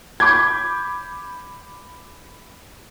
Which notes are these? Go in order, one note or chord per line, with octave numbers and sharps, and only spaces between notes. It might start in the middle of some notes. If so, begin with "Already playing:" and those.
B5 D6 G6 G#6